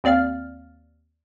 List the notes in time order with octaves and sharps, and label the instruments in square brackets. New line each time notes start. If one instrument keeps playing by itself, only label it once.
[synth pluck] D#2 C4 D5 F5 F6